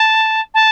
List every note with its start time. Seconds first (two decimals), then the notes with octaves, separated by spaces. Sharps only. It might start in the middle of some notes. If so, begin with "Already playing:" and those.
Already playing: A5
0.54 A5